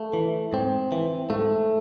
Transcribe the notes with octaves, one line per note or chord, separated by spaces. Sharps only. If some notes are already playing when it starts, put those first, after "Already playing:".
Already playing: A3
E3
G#2 C4
E3
G#2 A3